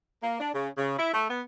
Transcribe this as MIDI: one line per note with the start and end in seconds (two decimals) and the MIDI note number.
0.23 0.39 58
0.40 0.50 62
0.54 0.69 49
0.78 0.99 49
0.99 1.10 64
1.13 1.28 57
1.30 1.42 59